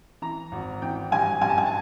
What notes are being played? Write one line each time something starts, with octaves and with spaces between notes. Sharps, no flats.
E3 A#5
G#1
E3 G5
G2 G#5
G2 G#5
A5
G#5
A5